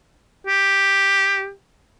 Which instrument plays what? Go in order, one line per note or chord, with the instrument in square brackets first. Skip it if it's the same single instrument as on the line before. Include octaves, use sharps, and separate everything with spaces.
[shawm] G4